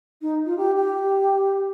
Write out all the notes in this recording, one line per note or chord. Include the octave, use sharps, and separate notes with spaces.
D#4
F4
G4
G4